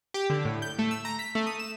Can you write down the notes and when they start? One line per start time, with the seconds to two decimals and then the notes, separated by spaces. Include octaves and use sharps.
0.14 G4
0.30 D3
0.45 A2
0.62 G6
0.79 A3
0.91 E6
1.05 A#5
1.19 B6
1.35 A3
1.47 D#6
1.59 E7